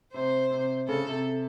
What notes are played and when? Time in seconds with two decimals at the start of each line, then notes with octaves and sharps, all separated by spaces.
0.14 C3 C5
0.51 C3
0.88 C#3 A4
1.07 C3